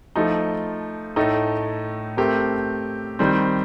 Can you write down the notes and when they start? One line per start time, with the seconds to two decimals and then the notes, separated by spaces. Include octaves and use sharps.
0.16 F3 A3 D#4
1.16 A2 A3 D#4
2.17 A3 C4 G4 A#4
3.19 D#3 G3 C4